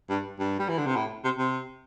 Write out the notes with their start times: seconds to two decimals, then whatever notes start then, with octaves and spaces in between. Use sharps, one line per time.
0.10 G2
0.39 G2
0.60 G3
0.69 E3
0.78 D3
0.86 C3
0.96 A2
1.24 C3
1.38 C3